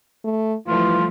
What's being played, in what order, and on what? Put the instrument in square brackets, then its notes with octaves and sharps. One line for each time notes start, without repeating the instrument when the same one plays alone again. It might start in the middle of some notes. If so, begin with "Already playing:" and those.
[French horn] A3
[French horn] E3 [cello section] F3 G3 A3 [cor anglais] F4